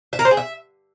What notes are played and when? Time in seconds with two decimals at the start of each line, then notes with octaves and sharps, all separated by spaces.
0.13 E5
0.19 A#4
0.25 C5
0.31 G#4
0.37 E5